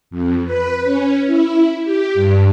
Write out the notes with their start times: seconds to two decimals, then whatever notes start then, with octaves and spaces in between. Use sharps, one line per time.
0.11 F2
0.45 B4
0.84 C#4
1.27 E4
1.85 G4
2.14 G2